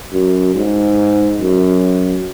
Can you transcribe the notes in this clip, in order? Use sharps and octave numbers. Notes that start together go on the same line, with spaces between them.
F#2
G#2
F#2